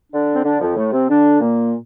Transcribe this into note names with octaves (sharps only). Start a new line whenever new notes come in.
D3 D4
C4
D3 D4
F2 F3
A2 A3
C3 C4
D3 D4
A#2 A#3